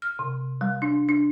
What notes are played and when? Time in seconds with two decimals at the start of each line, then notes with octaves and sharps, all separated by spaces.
0.02 F6
0.19 C3
0.61 G3
0.82 D4
1.09 D4